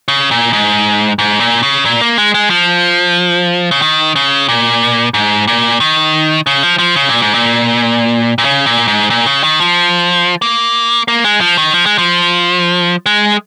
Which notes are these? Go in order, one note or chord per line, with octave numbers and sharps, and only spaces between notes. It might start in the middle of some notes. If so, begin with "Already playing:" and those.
C#3
A#2
G#2
G#2
A#2
C#3
A#2
A#3
G#3
G#3
F3
C#3
D#3
C#3
A#2
G#2
A#2
D#3
C#3
F3
F3
C#3
A#2
G#2
A#2
A#2
C#3
A#2
G#2
A#2
C#3
D#3
F3
A#3
A#3
G#3
F3
D#3
F3
G#3
F3
G#3